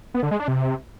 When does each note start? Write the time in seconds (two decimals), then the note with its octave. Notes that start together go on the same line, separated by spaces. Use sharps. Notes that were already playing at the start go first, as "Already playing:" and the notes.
0.14 B3
0.23 D3
0.31 G#3
0.40 D4
0.48 C3